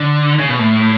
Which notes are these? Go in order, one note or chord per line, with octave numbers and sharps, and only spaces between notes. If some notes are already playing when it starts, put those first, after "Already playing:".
Already playing: D3
C#3
B2
A2